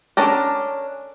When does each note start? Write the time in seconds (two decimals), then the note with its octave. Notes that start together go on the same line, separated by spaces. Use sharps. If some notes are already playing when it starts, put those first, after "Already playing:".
0.17 C#4 D4 A4 A#4